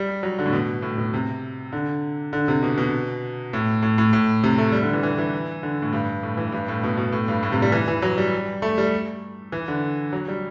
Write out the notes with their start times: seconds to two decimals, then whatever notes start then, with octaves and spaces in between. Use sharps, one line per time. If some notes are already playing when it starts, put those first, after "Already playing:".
Already playing: G3
0.23 F#3
0.39 D3
0.46 A2
0.53 B2
0.82 A2
0.98 B2
1.14 C3
1.73 D3
2.33 D3
2.48 C3
2.63 B2
2.78 B2
3.53 A2
3.83 A2
3.98 A2
4.13 A2
4.44 C3
4.58 A3
4.72 G3
4.83 D3
4.93 E3
5.03 E3
5.18 E3
5.63 D3
5.82 A2
5.93 G2
6.23 A2
6.37 E3
6.52 G2
6.68 A2
6.83 B2
6.97 B2
7.13 A2
7.28 G2
7.43 A2
7.52 C3
7.62 G3
7.72 E3
7.88 E3
8.02 F#3
8.18 G3
8.62 A3
8.78 G3
9.52 E3
9.68 D3
10.13 F#3
10.28 G3